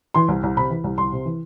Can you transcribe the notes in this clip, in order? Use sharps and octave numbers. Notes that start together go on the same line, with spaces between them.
E3 C6
C2
C2
C3 B5
E3
C2
C2 C6
C3
E3